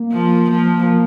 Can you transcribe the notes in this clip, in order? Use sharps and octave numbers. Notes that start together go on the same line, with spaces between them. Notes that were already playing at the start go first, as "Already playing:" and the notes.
Already playing: A#3
F3
F3 A#3